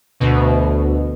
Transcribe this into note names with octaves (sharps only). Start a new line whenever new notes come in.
D2 B2